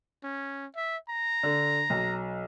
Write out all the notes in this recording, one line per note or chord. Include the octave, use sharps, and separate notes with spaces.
C#4
E5
A#5
D3
B1